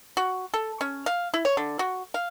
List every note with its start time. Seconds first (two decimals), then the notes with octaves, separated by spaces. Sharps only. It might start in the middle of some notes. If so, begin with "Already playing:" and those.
0.17 F#4
0.54 A4
0.81 C#4
1.06 F5
1.34 E4
1.45 C#5
1.57 D3
1.79 F#4
2.14 F5